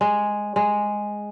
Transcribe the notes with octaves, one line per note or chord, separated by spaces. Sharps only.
G#3
G#3